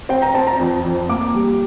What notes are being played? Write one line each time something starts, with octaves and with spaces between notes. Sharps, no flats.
C4 G5
A#5
C4 A5
A#5
F2
F2
A#3 D6
G3